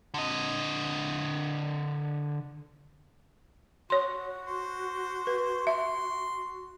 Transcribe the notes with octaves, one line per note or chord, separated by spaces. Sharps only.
D3 D#5
F#4 C#5 C6
C5
B4
E5 C6